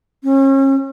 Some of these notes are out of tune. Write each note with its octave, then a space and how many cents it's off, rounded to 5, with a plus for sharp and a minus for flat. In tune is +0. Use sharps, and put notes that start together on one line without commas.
C#4 -35